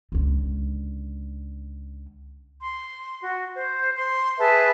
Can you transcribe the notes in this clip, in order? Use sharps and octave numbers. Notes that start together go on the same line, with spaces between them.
C#2 D3
C6
F#4
C5
C6
G#4 B4 E5 A5